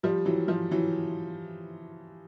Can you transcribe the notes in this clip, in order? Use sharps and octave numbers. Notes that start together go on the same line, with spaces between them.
F3 G3
E3 F#3
F3
E3 F#3